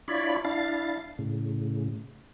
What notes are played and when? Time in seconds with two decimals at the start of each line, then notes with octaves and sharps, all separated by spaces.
0.08 D4 E4 F4 C#5 D5 B5
0.45 D4 E4 F5 A6
1.19 A2 C#3